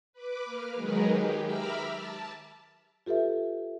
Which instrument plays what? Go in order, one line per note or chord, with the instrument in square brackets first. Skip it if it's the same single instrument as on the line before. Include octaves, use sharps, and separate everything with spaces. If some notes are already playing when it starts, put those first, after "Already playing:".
[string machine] B4 D6
A#3 F6
D#3 F#3 G#3 G#4 A#4 B4
G4
E5 A#5 B5 D6 E6 F6
A5
[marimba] F4 G4 A4 B4 E5